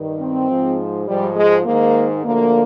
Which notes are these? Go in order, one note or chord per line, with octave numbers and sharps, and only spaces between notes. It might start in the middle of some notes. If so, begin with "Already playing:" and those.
Already playing: G2 D#3
C4
G#2 F3
G#2 F3 G3
G#3
G#2 D#3 A#3
D2 D3 F3 A#3